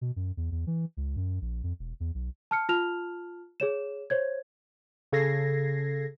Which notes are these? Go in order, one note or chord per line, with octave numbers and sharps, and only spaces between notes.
B2
F#2
E2
E2
E3
C#2
F#2
A#1
F2
E1
E2
B1
A5 F6 C#7
F4 A5 F6 F7
G#4 C#5 E7
C5 C#5 G#6
C#3 A4 G#6 A#6 C7